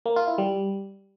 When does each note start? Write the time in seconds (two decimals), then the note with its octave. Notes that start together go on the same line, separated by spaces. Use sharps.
0.06 A#3
0.16 F4
0.27 E4
0.38 G3